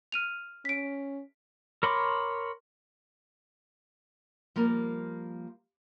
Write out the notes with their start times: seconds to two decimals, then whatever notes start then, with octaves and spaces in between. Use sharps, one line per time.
0.12 F6 D#7 F7
0.65 C#4 B6 D7
1.83 A#4 C#5 B5 C6 D6
4.56 F3 G3 A#3 A#4